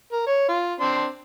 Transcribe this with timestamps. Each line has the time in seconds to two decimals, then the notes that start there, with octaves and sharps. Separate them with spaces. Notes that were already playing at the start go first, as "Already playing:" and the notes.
0.12 A#4
0.27 C#5
0.49 F4
0.80 C4 D4 C6